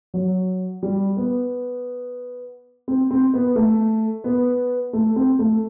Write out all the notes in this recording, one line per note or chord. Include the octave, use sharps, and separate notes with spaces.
F#3
G3
B3
C4
C4
B3
A3
B3
A3
C4
A3